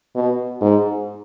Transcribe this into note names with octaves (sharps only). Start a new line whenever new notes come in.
B2
G#2